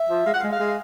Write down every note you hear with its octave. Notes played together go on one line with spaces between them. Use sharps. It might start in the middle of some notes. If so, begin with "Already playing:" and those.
Already playing: E5
F3
G#3 F5
F#5
G#3 F5
F5
G#3